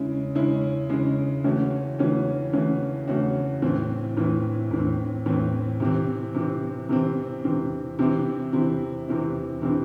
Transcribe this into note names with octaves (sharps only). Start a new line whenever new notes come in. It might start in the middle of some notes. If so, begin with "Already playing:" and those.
Already playing: C#3 G#3 C#4 E4
C#3 G#3 C#4 E4
C#3 G#3 C#4 E4
C#3 E3 A3 C#4 F#4
C#3 E3 A3 C#4 F#4
C#3 E3 A3 C#4 F#4
C#3 E3 A3 C#4 F#4
A2 E3 C4
A2 E3 C4
A2 E3 C4
A2 E3 C4
C3 E3 C4
C3 E3 C4
C3 E3 C4
C3 E3 C4
C3 E3 C4 E4
C3 E3 C4 E4
C3 E3 C4 E4
C3 E3 C4 E4